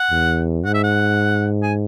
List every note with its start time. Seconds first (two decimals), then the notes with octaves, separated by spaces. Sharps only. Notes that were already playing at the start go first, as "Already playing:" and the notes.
Already playing: F#5
0.11 E2
0.65 G#2 F#5
0.74 E5
0.84 F#5
1.63 G#5